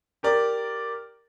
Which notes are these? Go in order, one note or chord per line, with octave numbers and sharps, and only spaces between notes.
G4 A#4 D5